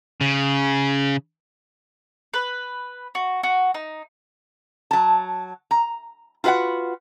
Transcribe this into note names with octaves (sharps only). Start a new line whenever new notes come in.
C#3
B4
F#4
F#4
D#4
F#3 A5
A#5
F4 F#4 B4 F5 F#5